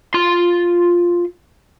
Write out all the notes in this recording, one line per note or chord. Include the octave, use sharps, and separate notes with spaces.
F4 C6